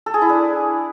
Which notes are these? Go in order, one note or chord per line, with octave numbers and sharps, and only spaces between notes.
A4
G#4
E4
D4